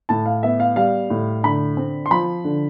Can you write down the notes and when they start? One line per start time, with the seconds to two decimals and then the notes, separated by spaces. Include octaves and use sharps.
0.09 A2 A5
0.26 F5
0.43 B3 E5
0.60 F5
0.76 G3 F5
1.10 A2
1.43 D3 B5
1.77 C4
2.06 C6
2.11 F3 B5
2.44 D3